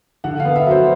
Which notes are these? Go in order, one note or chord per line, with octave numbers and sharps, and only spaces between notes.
D3 F#5
F5
B3
E5
F#3 C5